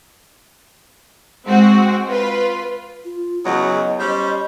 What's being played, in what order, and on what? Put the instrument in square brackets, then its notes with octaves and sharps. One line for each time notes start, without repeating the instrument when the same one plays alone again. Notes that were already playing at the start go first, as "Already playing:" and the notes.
[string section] G#3 C4 F#4
F4 B4
[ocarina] F4
[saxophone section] E2 C#3 F#3 [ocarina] D#5
[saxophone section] G3 C#4 C5